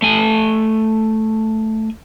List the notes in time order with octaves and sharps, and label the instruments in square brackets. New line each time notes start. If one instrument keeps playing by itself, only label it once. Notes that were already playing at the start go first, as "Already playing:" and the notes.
[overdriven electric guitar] A3 G#5